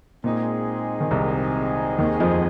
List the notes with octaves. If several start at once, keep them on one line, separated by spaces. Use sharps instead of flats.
A#2 G#3 C4 D#4 G#4
D#3
C2 C3
D#2 D#3
F2 F3